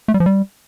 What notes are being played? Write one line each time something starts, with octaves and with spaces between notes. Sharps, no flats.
A3
G3
F3
G3